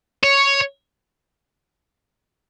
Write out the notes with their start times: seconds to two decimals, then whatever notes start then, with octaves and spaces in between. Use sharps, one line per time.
0.23 C#5